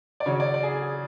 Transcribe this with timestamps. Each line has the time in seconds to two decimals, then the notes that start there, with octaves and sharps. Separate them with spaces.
0.20 D5
0.26 C#3 F#3 C#5
0.40 D5
0.54 D5
0.63 G#4
0.82 G#4